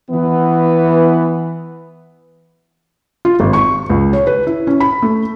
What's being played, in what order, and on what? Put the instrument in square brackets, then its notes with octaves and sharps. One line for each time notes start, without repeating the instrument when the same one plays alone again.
[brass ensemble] E3 B3
[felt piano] F4
G#1
C#6
C#2
C#5
B4
E4
C#4
B5
A3